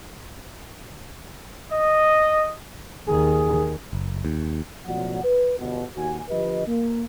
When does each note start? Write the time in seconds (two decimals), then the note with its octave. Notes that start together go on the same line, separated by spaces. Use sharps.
1.72 D#5
3.07 D#2 D#3 G#4
3.93 F#1
4.25 D#2
4.86 A1 B2 F3 F#3 D5 F#5
5.23 B4
5.59 G1 B2
5.96 D#2 F#4 G#5
6.29 D3 F3 G4 B4 D#5
6.67 A#3